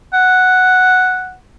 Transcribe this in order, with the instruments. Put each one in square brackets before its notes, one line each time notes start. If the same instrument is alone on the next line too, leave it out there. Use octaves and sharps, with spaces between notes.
[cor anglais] F#5